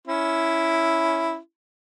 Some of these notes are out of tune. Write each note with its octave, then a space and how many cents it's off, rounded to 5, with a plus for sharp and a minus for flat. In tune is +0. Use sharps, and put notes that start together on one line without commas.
C#4 +5 E4 +0